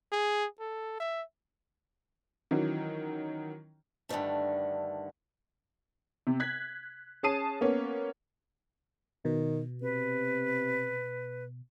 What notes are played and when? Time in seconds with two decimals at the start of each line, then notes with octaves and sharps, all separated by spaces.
0.12 G#4
0.60 A4
1.00 E5
2.51 D#3 E3 F#3 C#4
4.09 G2 D3 D#3 F3 A3
6.27 C3
6.40 F#6 G#6 B6
7.23 C#4 G#4 A5 D#6 C7 D#7
7.61 A#3 B3 C#4
9.25 B2 D#3
9.82 C3 B4